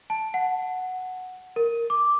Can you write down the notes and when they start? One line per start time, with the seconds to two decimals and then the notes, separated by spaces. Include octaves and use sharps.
0.10 A5
0.34 F#5
1.56 A#4
1.90 D6